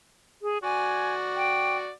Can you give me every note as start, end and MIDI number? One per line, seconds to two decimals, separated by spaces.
0.42 0.58 68
0.63 1.89 66
0.63 1.89 74
0.63 1.14 80
1.36 1.78 79